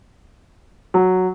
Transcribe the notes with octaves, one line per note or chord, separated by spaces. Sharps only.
F#3